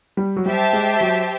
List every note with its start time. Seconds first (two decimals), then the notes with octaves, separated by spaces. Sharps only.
0.17 G3
0.36 F#3
0.45 G3 G4 C5 E5 A5
0.73 G#3
1.01 F#3